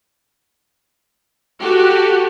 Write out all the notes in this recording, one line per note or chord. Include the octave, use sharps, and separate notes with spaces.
F#4 G4 A4